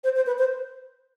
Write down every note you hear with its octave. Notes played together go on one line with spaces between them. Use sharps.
C5
C5
B4
C5